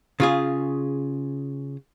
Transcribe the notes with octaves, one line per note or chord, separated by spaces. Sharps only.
C#3 F4 G#4